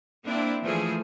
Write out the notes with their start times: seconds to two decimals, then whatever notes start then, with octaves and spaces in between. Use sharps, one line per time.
0.25 A#3 C4 D4 E4
0.63 E3 F3 A3 G#4